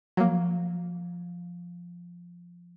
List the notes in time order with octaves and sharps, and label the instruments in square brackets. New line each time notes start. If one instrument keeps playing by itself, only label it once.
[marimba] F3 [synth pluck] F#3 A#3